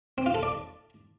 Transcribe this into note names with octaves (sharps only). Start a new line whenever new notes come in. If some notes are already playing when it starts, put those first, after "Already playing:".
C4
F4
A4
D5